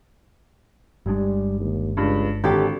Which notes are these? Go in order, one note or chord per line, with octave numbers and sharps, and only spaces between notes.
G1 G3 G#3 D4
D#2
C#2 G2
G#1 D3 G4 A4